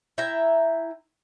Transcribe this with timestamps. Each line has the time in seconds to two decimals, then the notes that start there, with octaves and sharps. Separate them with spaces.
0.18 E4 E5 G5 A#5